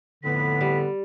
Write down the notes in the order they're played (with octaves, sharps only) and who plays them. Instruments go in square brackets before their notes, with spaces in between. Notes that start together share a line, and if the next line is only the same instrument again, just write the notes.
[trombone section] F2 A2 B3 [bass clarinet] D3 [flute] B6
[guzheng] G3